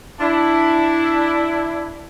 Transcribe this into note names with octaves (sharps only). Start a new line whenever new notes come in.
D4 E4